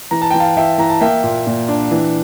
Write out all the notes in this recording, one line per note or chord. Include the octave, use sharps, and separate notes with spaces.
E3 A#5
A5
E3 G5
F5 A5
E3 E5 G5
E3 A#5
A5
A#3 E5 G5
A#2
A#2
D4
E3